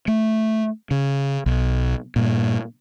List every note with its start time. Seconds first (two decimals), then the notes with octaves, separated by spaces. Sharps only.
0.08 A3
0.91 C#3
1.46 B1
2.16 G2 A#2